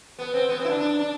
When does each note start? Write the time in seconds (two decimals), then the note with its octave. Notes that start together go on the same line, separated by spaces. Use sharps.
0.19 B3
0.34 C4
0.49 B3
0.59 C4
0.65 E4
0.69 D4
0.79 D4
0.99 D4